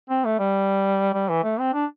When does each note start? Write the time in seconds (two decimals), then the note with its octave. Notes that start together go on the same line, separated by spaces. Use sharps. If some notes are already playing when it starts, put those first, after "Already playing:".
0.10 C4
0.25 A3
0.39 G3
1.14 G3
1.29 E3
1.44 A3
1.60 C4
1.74 D4